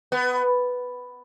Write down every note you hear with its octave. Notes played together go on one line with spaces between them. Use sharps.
B3